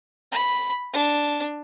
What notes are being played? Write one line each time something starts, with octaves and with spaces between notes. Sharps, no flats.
B5
D4